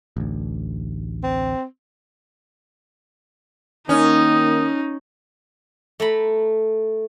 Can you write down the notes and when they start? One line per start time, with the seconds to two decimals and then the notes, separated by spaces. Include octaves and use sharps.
0.17 A1 D2
1.23 C4
3.89 D#3 A#3 C#4 D#4 D#6
6.00 A3 A#5 B5